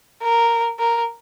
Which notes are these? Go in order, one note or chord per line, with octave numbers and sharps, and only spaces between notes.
A#4
A#4